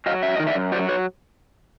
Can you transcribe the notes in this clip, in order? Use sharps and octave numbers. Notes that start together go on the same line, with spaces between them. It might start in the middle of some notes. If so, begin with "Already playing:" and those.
F#3 D#5 F5
F#2 E5
D#3 D#5
D5 E5
F#2
F#3 C5 D5
B4 C#5